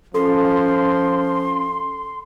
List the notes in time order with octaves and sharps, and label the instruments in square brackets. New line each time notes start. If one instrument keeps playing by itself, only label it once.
[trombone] F3 [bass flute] C#4 [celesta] A4 [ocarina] C6